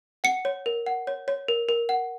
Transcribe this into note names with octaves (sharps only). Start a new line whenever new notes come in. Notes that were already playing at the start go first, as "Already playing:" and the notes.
F#5 C#7
C#5
A#4
F#5
C#5
C#5
A#4
A#4
F#5